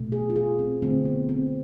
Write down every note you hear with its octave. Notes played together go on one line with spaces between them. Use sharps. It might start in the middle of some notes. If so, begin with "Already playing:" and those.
Already playing: B2 A3
G#4
F4
G#4
C4
D3 A3 C4
B3
C4